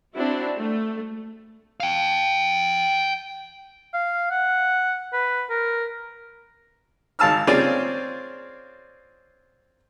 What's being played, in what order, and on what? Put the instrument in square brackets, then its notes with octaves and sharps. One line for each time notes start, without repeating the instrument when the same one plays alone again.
[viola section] C4 D4 E4 F#4
A3
[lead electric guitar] F5 G5
[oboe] F5
F#5
B4
A#4
[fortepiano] G#1 F5 A5 E6 F6
C4 C#4 F4 G#4 C5 D5